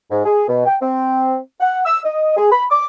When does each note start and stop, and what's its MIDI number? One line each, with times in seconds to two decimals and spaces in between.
0.10 0.21 44
0.25 0.46 68
0.48 0.64 47
0.66 0.75 79
0.81 1.36 60
1.60 1.80 78
1.85 1.98 88
2.03 2.35 75
2.36 2.48 68
2.51 2.63 83
2.70 2.86 86